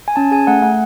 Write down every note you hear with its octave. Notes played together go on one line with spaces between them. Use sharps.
G#5
C#4 A5
G#4 G#5
A3 F#5
A3 F#5